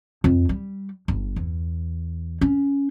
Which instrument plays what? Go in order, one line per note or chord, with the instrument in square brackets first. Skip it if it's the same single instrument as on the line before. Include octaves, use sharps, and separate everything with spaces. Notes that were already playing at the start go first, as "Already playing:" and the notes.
[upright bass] F2
G3
G1
E2
C#4